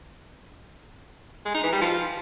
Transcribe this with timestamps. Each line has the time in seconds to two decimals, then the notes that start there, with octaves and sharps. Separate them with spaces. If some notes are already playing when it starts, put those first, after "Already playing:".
1.45 G#3
1.54 D#4
1.63 E3
1.72 G3
1.81 F3